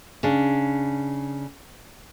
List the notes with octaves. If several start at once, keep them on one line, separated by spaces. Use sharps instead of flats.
C#3 D4